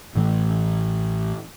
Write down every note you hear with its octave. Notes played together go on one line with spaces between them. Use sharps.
A1 A2 E3 A3